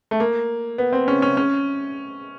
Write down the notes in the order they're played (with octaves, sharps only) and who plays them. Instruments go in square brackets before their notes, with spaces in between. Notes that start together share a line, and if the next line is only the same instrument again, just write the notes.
[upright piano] A3
A#3
B3
C4
C#4
C#4
C#4